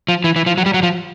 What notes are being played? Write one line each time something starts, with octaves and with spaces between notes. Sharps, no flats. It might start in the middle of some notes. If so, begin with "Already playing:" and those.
F3
E3
E3
F3
F#3
G3
F#3
F3